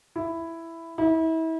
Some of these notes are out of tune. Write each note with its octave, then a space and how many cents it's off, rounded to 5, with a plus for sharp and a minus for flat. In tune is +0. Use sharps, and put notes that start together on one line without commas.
E4 +5
E4 -35